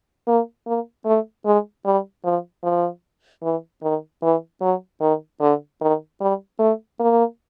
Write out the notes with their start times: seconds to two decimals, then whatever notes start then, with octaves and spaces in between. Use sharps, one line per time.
0.27 A#3
0.67 A#3
1.06 A3
1.46 G#3
1.86 G3
2.24 F3
2.64 F3
3.43 E3
3.83 D#3
4.22 E3
4.61 F#3
5.01 D#3
5.41 D3
5.81 D#3
6.21 G3
6.59 A3
7.00 A#3